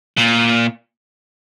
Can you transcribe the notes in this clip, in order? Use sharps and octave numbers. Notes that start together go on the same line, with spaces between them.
A#2